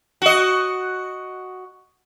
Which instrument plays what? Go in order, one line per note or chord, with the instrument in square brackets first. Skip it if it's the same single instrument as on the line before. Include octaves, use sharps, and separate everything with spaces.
[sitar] F#4 D#5